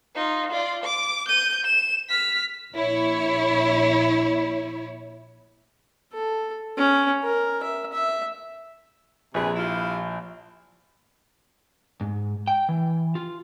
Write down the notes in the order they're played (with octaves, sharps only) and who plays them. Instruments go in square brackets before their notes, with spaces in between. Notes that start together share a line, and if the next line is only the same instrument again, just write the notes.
[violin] D#4 F4
F4 D5
D6
G6 D#7
E7
F6 B6
[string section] A#1 E4 C#5
[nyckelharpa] A4
C#4
A#4
E5
E5
[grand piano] A#1 [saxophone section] C3 G#4 B4
[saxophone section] E4 F4 G4
[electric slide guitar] G#2
G5
E3
F4